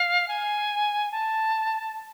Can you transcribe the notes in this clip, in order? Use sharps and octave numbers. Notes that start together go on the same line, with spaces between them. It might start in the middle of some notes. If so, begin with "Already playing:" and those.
Already playing: F5
G#5
A5